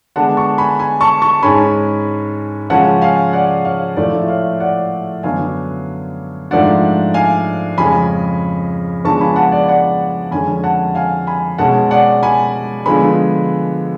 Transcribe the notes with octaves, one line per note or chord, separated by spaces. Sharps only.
D3 G#3 B3 D4 F#5 A5
A5 C#6
G#5 B5
G#5 B5
A5 C#6
A5 C#6
G#2 G#3 C#4 G#5 B5
C#3 F3 G#3 C#4 F#5 A5
F5 G#5
D5 F#5
C#5 F5
A2 F3 A3 D5
C#5 F5
D5 F#5
F#2 D3 F#3 B3 D4 F5 G#5
G#2 F3 A3 D4 D5 F#5
F5 G#5
F2 C#3 G#3 G#5 B5
C#3 F3 G#3 B3 D4 A5 C#6
G#5 B5
F#5 A5
D5
D5 F#5
F2 D3 G#3 C#4 G#5 B5
F#5 A5
F5 G#5
G#5 B5
B2 G#3 C#4 F#5 A5
D5 F#5
G#5 B5
D3 F3 G#3 B3 G#5 B5